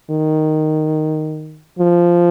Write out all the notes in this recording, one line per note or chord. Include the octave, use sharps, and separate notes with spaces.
D#3
F3